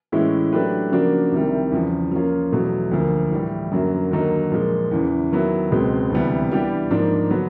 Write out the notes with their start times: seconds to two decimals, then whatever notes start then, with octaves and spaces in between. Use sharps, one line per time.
0.12 A2 E3 G#3 C#4 E4
0.53 F#3 A3 D4 G4 B4
0.92 C#3 F3 A#3 D4 F#4
1.32 C2 C3 D#3 G3
1.72 E2 C#3 F3
2.12 F3 A#3 C#4 F4
2.52 E2 B2 F#3 A3
2.91 D2 D3 F3 A#3
3.32 A2 E3 G3
3.71 F#2 D3 F#3 A#3
4.11 D#2 D3 F#3 A#3 D#4
4.52 A#2 F3 G#3
4.91 E2 C#3 E3
5.31 D#3 F#3 B3 E4
5.71 C#2 B2 G#3 C4
6.10 D2 C3 E3 G3 B3
6.51 E3 G3 B3 D4 G4
6.91 G#2 F3 A#3 D4
7.30 D3 F#3 B3